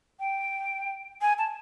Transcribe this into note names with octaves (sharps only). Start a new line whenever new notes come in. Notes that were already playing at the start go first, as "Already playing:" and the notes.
G5
G#5
A5